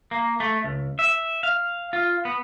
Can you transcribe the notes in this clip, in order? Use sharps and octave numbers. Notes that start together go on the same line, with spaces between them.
A#3
A3
C#2
E5
F5
F4
B3